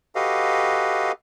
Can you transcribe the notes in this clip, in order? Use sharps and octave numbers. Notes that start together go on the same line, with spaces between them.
F#4 G4 A4 B4 D#5 F5